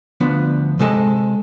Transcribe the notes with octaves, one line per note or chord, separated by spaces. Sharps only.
D2 F3 B3 D4
C3 G#3 A4 D#5